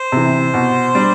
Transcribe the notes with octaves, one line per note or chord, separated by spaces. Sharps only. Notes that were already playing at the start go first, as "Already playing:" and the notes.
Already playing: C5
C3 E3
B2
G3 D4